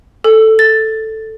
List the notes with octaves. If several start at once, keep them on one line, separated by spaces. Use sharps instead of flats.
A4
A6